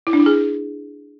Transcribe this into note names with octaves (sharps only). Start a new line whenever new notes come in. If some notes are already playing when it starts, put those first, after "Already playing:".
E4
D4
E4
G#4